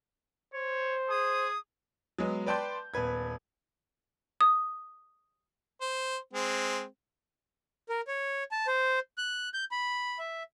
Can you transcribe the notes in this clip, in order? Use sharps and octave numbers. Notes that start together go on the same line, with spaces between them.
C5 C#5
G#4 D#6
F#3 G#3 B3
B4 D5 G5 A5 C6 G6
D#1 B3 B4 G#6
D#6
C5
G#3 C4
A#4
C#5
A5
C5
F#6
G6
B5
E5